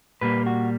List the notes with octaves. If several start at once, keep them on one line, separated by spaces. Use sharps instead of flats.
A#2 G3 A#3 B4
F#4